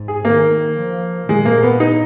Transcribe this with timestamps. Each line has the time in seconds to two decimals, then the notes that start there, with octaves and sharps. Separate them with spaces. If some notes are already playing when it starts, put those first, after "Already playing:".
Already playing: G#2
0.08 G#4
0.25 D#3 A#3
0.77 F3
1.29 A#2 G#3
1.45 A#3
1.63 B3
1.80 D#4